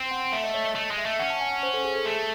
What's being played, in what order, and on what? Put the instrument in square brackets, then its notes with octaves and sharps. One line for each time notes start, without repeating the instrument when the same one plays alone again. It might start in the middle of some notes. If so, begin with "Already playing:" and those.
Already playing: [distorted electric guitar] C4
[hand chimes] F#5
[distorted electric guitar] A3 [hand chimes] E5
[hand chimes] D#5
C#5
D#5
[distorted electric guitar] A3 [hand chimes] D#5
[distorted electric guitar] G#3
[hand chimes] E5
[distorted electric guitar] A3
[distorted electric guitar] C#4 [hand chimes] F#5
[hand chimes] A5
G#5
F#5
C5
A4
G#4
A4
[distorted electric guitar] A3 [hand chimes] A4